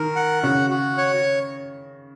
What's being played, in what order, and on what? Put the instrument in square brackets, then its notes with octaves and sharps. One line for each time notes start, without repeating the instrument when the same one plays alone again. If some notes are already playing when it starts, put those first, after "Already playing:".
Already playing: [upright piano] D#3 [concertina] A#4
[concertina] F#5
[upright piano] C#3 [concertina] F#4
[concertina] F#4
C#5